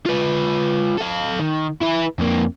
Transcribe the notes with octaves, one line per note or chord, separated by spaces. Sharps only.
F4 B4
A4 F5
D#3
E4 B4
F2 A#3